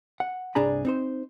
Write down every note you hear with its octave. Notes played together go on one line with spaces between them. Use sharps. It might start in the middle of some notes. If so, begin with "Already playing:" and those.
F#5
C2 G2 D4 G#4 A#5 B5
C4 D#4 C5